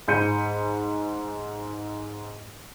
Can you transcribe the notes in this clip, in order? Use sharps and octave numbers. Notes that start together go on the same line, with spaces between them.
G#2 B5 G6 C#7 D#7